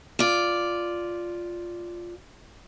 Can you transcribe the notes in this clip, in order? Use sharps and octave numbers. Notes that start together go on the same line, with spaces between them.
F4 D5